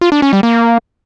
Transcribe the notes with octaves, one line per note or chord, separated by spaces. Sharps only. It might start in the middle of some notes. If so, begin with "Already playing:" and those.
F4
D4
C#4
G3
A#3